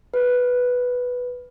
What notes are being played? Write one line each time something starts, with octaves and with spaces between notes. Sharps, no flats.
B4